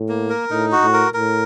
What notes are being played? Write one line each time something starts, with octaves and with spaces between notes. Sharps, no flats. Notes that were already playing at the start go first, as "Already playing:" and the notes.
Already playing: A2
A#3
A#4
A2 D#4
F#4
A2
A#4
A2 A#4